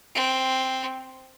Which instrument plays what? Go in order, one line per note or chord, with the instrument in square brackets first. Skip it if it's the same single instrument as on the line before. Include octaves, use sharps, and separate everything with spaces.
[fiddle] C4